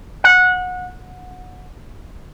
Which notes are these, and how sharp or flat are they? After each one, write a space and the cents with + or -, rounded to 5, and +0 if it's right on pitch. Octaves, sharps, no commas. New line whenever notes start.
F#5 -20